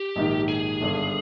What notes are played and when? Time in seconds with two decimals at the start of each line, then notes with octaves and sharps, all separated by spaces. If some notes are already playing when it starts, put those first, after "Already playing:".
Already playing: G4
0.16 A#1 G#2 D#3
0.48 G#4
0.81 G1 G2 D3